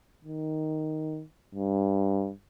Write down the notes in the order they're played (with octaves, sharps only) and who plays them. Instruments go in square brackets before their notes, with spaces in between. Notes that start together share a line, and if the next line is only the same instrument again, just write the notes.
[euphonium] D#3
G2